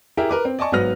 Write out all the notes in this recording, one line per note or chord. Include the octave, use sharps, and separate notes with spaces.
E4 G4 G#4 A#4 E5
A#4 B4 D6
C4
D5 D#5 G#5 A5 C#6
G#1 F#3 B3 B4 F6 A#6